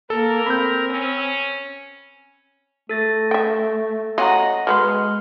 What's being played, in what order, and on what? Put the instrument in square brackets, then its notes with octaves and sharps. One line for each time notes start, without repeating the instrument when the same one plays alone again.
[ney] A#3 [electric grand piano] A4 [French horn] A#4
[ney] C4 [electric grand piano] B5 G6
[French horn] C#4
[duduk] A3 [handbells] A4 A6 A#6
[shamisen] E5 G5
[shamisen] F#3 C#4 F4 [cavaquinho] D#5 F#5 A#5
[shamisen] F#3 B3 B4 [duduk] G#3 [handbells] C6 F6